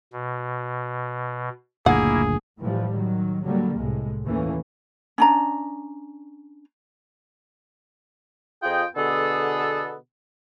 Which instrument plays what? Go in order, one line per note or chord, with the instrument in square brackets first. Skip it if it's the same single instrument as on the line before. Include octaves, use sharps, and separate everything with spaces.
[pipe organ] B2
[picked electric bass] F#1 D2 A#2 [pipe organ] A#3 E4 [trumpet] G#4 [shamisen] F#5
[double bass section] A2 E3 F3 G3
D#3 F#3
D3 F#3 G3 A#3
C2 A2 G#3
D#2 E3 A3 A#3 C#4
[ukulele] C#4 D4 A#5
[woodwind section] F2 F4 G#4 D#5 G5
B2 D3 B3 G#4 A4